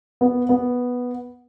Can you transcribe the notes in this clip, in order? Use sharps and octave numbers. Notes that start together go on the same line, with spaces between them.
B3
B3